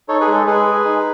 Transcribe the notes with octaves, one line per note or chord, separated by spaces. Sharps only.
D#4 A4 C#5
G#4 B4
G#3
A4
G#3 G#4 B4
G#4
D#4